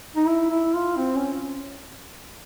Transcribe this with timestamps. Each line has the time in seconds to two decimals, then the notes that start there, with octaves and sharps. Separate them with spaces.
0.16 D#4
0.27 E4
0.51 E4
0.74 F4
0.97 C4
1.15 C#4